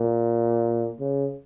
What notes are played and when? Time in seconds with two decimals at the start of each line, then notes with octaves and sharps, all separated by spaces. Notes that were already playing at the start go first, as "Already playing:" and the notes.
Already playing: A#2
1.00 C#3